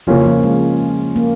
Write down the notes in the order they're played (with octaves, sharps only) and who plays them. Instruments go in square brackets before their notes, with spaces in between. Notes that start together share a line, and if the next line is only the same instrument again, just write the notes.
[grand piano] C#3 A#3 C#4 F4 [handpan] F3
[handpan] F3
G#3
A#3